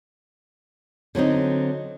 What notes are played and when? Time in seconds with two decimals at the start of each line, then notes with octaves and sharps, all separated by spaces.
1.15 D3 F#3 C4 D#4